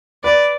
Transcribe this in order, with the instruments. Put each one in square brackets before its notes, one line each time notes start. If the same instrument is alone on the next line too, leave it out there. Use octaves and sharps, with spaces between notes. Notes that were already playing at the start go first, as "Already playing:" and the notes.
[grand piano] B4 [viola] D5